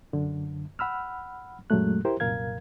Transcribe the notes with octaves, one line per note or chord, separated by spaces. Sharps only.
F#2 D3
F#5 B5 E6 F6
F#2 A#2 F#3 G#3 A3 F#6
E4 G4 A#4 C5
C2 F#2 A#2 A#4 F5 G#6